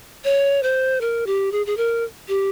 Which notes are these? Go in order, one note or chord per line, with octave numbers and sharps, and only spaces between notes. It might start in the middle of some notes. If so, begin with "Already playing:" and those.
C#5
C5
A#4
G4
G#4
G#4
A#4
G4